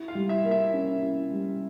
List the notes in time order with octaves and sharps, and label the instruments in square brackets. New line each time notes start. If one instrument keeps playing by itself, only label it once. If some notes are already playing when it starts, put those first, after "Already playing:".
Already playing: [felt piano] E4
[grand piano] F4 F5
[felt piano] G3
[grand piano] E4 E5
[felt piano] A#3
[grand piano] E4 E5
[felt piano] C#4
E4
G3